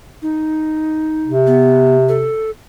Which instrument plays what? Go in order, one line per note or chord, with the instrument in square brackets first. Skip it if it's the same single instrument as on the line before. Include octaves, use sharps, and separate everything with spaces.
[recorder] D#4
[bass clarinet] C3
[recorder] B3
A4